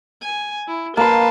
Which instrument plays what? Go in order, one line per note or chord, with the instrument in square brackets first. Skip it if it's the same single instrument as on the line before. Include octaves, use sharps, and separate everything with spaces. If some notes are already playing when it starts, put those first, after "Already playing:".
[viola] G#5
E4
[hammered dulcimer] A#3 C6 [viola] B4 A5